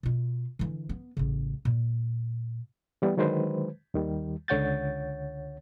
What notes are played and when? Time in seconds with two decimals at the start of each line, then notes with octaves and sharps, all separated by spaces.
0.03 B2 F4
0.59 D3 E3
0.89 B3
1.17 A1 C#3
1.65 A#2
3.02 E3 G3 B3
3.17 D3 D#3 F#3 G#3 B4 C5
3.94 D#2 D#3 G3
4.48 C#2 D3 C#5 F#5 G6 A6